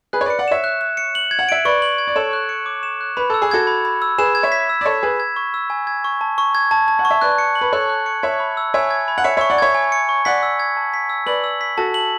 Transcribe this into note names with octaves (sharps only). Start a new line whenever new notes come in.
G#4 B4 F#6
C#5
B4 D5 C#7
D5 F#5
C#5 E5 E7
F#6
F#6
C#7
F#7
G#6
F#5
E5 D7
B4 D5 C#6
F#7
G#6
D5
A4 C#5 E7
F#6
C#7
D6
E7
F#6
B4 B5
A4 E6
G#4
F#4 A4 G#6
B5
B5
E6
G#4 B4 E7
G#6
C#5 E5
B6
E6
D5
A4 C#5 E7
G#4 B4 G#6
G#6
C#6
E6
G#5
G#6
C#6
A5
C#6
G#6
A5
A5
F#5
C#6
E5
B4 D5 F#6
C#7
F#7
B4
A4 C#5 F#6
F#6
C#7
C#5 E5 G#6
B5
E6
C#5 E5 G#5
G#6
B5
F#5
C#5 E5 C#7
C#5 E5 C#6
D5 F#5
C#5 E5 G#6
G#5
C#7
C#6
D5 F#5 B6
E6
G#6
A5
B6
E6
B4 D5 F#7
E6
B6
F#4 A4 A5
F#7